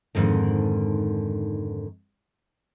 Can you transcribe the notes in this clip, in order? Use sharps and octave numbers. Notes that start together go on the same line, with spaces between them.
F2 G#2 D3 D#3